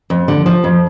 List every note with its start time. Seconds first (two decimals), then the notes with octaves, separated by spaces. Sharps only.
0.10 F2
0.28 D3
0.46 F3
0.64 F2